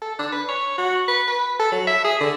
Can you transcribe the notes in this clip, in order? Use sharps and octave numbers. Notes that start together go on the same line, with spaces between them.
A4
D4
B4
C#5
F#4
B4
B4
A4
F#3
E5
G#4
D3